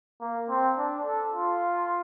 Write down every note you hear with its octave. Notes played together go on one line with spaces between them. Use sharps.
A#3
C4
D4
A4
F4